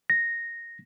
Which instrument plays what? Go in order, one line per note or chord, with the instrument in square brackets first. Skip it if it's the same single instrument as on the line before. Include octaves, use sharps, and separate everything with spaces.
[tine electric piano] A#6